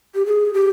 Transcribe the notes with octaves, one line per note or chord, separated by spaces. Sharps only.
G4
G#4
G4